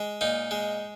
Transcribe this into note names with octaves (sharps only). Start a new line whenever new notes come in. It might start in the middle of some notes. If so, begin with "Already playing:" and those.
Already playing: G#3
A#2 D#4
G#3